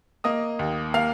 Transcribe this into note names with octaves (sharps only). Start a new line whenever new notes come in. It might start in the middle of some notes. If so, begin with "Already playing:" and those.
A#3 D#5 D#6
D#2
A#3 F5 F6